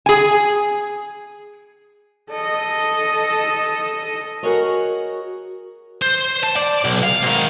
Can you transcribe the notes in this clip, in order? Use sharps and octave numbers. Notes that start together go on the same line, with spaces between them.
G#4 G#5
A4 D#5
F#4 G#4 A#4 C#5 D#5
C5
A5
D5
B1
F5
G#2 D#3